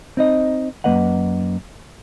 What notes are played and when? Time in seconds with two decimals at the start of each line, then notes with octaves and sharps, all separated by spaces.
0.17 C4 D#4 D#5
0.84 F#2 A#3 B4 D#5 F#5